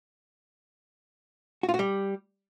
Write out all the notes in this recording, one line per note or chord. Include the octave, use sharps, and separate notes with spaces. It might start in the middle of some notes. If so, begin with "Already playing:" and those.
F#4
F4
F#4
G3